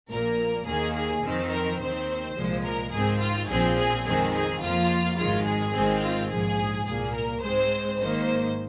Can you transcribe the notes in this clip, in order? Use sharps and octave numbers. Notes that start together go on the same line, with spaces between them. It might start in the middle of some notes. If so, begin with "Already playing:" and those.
A#1 A#2 A#3 A#4
D#2 D#3 A#3 G#4
G#4
F2 D#3 C4
A#4
D#2 D#3 C4 C5
C2 A#2 F3 G#3
A#4
G#2 D#3 C4 G#4
F4
A#1 A#2 F3 C4 G#4
G#4
F2 D#3 G#3 C4 G#4
G#4
F2 F3 A#3 F4
G#1 G#2 D#3 G#3 F4
G#4
G#1 G#2 D#3 G#3 C4
F4
A#1 G#2 F3 G#4
C2 A#2 A#3 G#4
A#4
G#2 G#3 C4 C5
G#1 G#2 D#3 A#3 C5